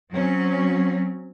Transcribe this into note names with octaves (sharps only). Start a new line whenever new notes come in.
F#3 C4 C#4